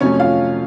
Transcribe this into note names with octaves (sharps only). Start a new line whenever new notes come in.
F2 C3 F#3 A3 C#4 C#5
F4 F5